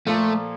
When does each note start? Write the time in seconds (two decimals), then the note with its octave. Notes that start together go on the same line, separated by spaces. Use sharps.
0.07 A#2 F3 A3 A#3 F4 A4